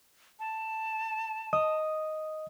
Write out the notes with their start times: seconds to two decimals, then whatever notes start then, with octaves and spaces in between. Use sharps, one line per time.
0.40 A5
1.53 D#5 D#6